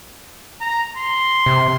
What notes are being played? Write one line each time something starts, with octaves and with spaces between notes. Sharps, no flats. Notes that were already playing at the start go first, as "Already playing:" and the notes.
A#5
C6
C3